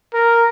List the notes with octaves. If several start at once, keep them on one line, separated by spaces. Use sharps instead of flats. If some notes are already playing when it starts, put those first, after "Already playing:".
A#4